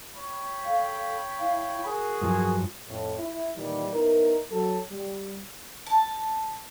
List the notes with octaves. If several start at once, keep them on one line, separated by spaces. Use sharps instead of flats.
C#5 G5 B5
A4 F5
E4 F5
F#4 G#4 A#4
G2 F3 F#3
F2 A2
E4
A#2 D#3 E3 G3
B3 D#4 E4 A#4
F#3 A4
G3
A5